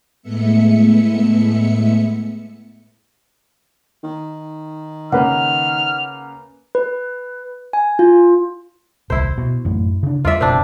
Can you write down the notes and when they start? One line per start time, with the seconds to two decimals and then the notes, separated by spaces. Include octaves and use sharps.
0.22 A2 G#3 A3 B3 E5 C#7
4.04 D#3
5.12 C#3 A#3 B4 F#5 F6
6.75 B4
7.73 G#5
7.99 F4
9.10 D#1 C2 E4 C5
9.38 B2
9.65 A1 F#2 A3
10.03 C#3 D4
10.25 E2 G3 F4 D5 E5
10.41 F#1 B2 C4 D4